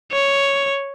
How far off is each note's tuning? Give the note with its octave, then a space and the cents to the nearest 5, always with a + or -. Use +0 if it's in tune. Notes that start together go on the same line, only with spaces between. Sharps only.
C#5 +0